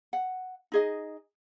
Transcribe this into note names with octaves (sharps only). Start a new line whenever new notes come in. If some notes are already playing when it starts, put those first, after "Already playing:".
F#5
D#4 G#4 D#5